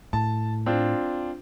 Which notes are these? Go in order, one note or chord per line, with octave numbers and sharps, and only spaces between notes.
A2 A5
C4 D4 F4